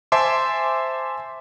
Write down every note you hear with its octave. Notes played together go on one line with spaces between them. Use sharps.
C5 E5 G#5 A5 C6 D6